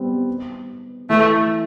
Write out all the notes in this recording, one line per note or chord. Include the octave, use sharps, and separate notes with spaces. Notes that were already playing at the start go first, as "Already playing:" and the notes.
Already playing: G3 B3 C4
E3 A3